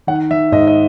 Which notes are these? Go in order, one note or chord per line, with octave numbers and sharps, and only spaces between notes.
D#3 F#5
D#3 E5
G#2 D#5
D#5